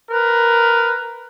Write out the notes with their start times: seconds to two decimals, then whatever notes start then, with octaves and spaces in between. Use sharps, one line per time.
0.11 A#4 B4